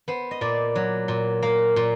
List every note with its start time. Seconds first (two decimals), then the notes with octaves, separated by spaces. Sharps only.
0.08 B3 C5
0.31 D#5
0.41 A#2 D5
0.76 F#3
1.08 A#2
1.43 A#3
1.76 A#2